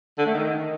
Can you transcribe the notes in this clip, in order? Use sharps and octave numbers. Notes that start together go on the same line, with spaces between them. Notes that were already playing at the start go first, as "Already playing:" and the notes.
D3
A3
D#3